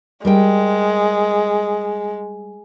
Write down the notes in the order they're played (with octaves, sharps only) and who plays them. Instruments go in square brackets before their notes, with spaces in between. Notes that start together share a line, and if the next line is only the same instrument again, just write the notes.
[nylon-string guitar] G3 A#4 G5 [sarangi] G#3